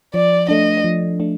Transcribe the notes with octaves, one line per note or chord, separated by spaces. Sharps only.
F3 D5
A3 D4 D#5
F3
A3 D4